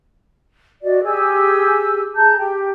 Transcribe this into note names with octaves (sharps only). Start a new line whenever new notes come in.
F#4 D5 D#5
G4 G#4 G#5 E6
G#4 A5 A#5 G6
G4 G5